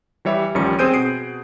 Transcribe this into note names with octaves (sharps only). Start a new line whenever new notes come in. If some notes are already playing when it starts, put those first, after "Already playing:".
E3 G3 C#5 E5
A1 D#3 F3 G3 C#4 C#7
C4 G#4 C5 G6 D7 D#7
B2 G#4 C7 D7